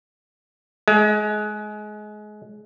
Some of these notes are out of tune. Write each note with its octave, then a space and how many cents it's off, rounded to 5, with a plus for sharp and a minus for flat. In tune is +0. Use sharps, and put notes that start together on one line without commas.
G#3 +25